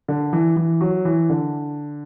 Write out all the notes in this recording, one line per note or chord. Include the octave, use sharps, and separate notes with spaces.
D3
E3
E3
F#3
E3
D3